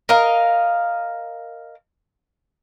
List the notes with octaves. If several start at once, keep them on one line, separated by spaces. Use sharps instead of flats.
A#4 D#5 F5